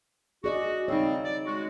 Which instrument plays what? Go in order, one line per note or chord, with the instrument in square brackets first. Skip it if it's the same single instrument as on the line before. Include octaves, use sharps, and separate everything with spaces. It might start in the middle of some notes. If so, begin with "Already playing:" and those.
[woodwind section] F#4 [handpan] G#4 D5 D#5
[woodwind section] C#3 G3 C4 [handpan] D#4 C#5
[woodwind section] D5
G#3 F#4